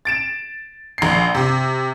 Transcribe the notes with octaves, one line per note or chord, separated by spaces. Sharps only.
A6 D7 E7
A#1 C7
C3